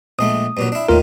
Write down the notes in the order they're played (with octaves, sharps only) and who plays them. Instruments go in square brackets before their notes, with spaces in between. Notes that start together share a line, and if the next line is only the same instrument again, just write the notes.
[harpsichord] A#1 G#3 A3 [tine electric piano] D#6
[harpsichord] G2 A#2 F#3
D4 E4
[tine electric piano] D#2 F4 A#4 [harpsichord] A2 D#3